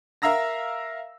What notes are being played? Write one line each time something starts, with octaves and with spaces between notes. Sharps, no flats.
A#4 E5 F5 A#5 E6 A#6